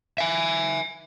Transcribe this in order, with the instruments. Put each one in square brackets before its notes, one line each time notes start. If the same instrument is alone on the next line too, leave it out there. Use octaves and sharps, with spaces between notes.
[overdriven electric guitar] E5 G#5